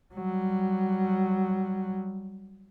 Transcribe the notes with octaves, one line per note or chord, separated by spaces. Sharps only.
F#3 G3